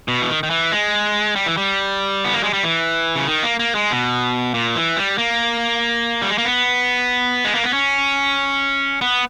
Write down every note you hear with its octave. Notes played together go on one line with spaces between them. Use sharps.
B2
E3
D#3
D#3
E3
G#3
G3
E3
G3
B3
A#3
G#3
G3
E3
C#3
D#3
A#3
A#3
G#3
B2
A#2
E3
G3
A#3
G3
G#3
A#3
B3
G#3
A#3
B3
C#4
B3